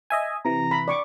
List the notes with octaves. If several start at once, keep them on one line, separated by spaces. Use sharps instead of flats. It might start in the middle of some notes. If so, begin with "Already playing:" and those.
D#5 E5 G#5
C3 E3 A#5
B5
D5 C#6 D6